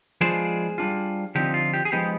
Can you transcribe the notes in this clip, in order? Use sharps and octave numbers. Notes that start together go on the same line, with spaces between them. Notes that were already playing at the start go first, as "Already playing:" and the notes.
F3 G#3 B3 D4 F4 G#4 C5
G3 D4 F4
D3 F3 C4 D#4 G4
F4
G4
G#4
F3 G#3 B3 D#4 G4